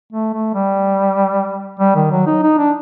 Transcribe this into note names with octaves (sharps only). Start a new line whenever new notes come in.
A3
A3
G3
G3
D#3
F#3
D#4
D#4
D4